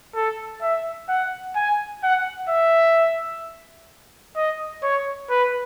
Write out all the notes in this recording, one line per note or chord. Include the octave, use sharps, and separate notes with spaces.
A4
E5
F#5
G#5
F#5
E5
D#5
C#5
B4